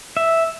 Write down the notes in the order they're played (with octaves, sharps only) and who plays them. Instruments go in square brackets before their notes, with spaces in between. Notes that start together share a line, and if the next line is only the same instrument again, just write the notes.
[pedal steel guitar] E5